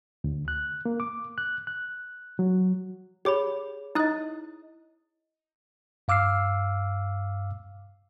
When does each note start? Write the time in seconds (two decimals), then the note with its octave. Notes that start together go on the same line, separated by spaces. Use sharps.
0.24 D2
0.48 F#6
0.86 A#3
1.00 D6
1.38 F#6
1.67 F#6
2.39 F#3
3.25 G4 G#4 C#5 B5 D6
3.95 D#4 E4 D#5 D#6 F#6
6.08 G2 F5 D6 E6 F6 C7